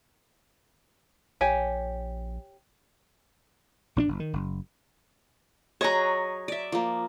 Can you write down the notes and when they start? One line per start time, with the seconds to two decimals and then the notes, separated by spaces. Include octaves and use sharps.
1.41 A#1 G4 C#5 G#5
3.96 A#1 C#4 D4
4.08 F#1
4.20 D#3
4.33 F#1
5.81 F#3 G#4 C#5 D#5 A#5
6.48 D5 E5
6.72 F3 A#3